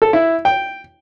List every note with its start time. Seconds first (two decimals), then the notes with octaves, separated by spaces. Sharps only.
0.02 A4
0.13 E4
0.45 G5